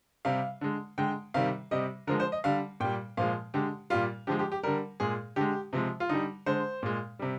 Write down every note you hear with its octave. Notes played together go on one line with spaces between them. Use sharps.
C3 G3 F5
D3 G#3
D3 G#3 G5
C3 D#3 G3 F5
C3 G3 D#5
D3 F3 G#3 A#4
C5
D#5
D3 G3 F5
A#2 G3 G5
A#2 F3 G#3 F5
D3 G#3 G4
A#2 G3 F4
D3 F3 G#3 G4
G4
G4
D3 G3 A#4
A#2 G#3 G#4
D3 G#3 G4
C3 F3 G#3
F4
D3 G3 D#4
D3 G#3 C5
A#2 G#3
C3 G3